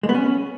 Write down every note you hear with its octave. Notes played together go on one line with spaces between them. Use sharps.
G#3
B3
C#4